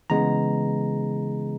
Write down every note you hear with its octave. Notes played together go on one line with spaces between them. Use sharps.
C#3 E3 G#3 B3 A#5